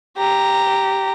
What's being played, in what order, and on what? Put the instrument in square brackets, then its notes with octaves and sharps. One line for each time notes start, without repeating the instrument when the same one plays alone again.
[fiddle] G4 A#5